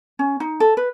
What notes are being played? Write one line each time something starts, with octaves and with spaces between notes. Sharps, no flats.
C#4
D#4
A4
B4